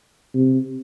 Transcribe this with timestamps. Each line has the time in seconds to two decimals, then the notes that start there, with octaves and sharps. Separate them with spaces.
0.34 C3